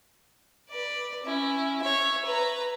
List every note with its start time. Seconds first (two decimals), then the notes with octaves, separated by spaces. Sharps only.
0.69 B4 D5
1.24 C#4 E4
1.82 C#5 E5
2.26 B4 A#5